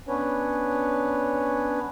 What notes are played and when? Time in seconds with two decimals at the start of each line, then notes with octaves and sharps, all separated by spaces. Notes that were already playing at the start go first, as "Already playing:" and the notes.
0.08 B3 C#4 D4 B4 C#5